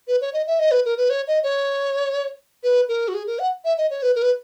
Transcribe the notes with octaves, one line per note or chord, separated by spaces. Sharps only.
B4
C#5
D#5
E5
D#5
B4
A#4
B4
C#5
D#5
C#5
B4
A#4
F#4
G#4
A#4
F#5
E5
D#5
C#5
B4
A#4
B4